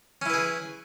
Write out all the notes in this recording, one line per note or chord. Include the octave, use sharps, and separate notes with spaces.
C#4 E4 G#4 B4